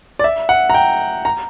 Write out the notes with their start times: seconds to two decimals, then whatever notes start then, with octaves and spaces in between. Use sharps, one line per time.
0.19 D5
0.24 E5
0.49 F#5
0.70 A#5
0.74 G5
1.25 A#5